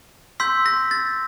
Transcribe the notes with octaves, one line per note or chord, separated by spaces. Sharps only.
C6 E6 G6 B6
A#6
A6